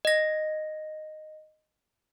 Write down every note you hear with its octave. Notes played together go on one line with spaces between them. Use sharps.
D#5 A#6